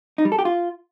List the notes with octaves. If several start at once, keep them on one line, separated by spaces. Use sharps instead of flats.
D#4
G3
A4
G4
F4